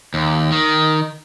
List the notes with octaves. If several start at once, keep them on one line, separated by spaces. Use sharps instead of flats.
D#2
D#3